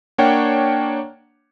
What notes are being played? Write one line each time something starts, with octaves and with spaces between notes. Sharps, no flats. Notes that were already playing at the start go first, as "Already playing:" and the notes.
A#3 D4 C#5 F#5 G5